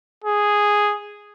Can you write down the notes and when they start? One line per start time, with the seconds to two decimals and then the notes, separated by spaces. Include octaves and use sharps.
0.24 G#4